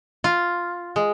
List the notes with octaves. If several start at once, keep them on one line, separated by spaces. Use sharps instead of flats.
F4
G#3